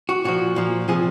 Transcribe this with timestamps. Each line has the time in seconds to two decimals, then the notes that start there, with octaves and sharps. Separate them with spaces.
0.09 F#4
0.24 A#2 F3 F#4
0.56 A#2 F3
0.88 C3 F3 G#4